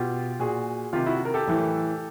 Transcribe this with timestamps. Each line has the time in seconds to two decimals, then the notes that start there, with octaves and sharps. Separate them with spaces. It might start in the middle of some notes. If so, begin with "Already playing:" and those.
Already playing: B2 F4 G4
0.39 A#2 F#4 G#4
0.93 C3 D#3 F4 G4
1.06 E4 F#4
1.25 A#4
1.34 G4 A4
1.47 A2 E3